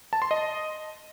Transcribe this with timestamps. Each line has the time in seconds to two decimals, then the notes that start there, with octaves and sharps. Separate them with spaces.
0.13 A5
0.22 C6
0.31 D#5